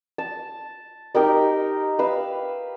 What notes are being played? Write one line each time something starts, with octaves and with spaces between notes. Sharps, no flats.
A5
D#4 G4 A#4 D#5
B4 E5 F5